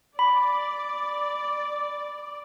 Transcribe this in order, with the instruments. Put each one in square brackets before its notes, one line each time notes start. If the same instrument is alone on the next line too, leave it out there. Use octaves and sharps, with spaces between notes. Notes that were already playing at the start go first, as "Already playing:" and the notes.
[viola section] D5 [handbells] B5